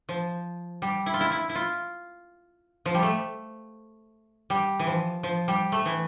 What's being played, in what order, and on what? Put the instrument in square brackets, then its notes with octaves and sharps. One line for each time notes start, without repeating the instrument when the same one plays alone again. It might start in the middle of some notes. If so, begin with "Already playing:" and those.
[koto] F3
G3
E4
F4
E4
E4
E4
F4
F3
G3
A3
G3
E3
F3
F3
G3
A3
E3